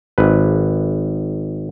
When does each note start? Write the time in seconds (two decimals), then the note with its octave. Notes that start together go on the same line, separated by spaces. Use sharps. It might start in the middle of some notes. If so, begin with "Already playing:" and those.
0.18 G#1 B4